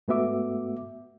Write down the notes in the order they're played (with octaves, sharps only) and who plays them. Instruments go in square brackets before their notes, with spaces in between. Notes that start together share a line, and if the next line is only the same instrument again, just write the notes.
[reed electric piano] G#2 A3 B3 F#4 E5 D6